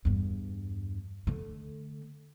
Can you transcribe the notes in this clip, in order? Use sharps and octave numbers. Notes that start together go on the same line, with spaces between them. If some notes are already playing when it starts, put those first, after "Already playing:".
E2 G2
D3 A3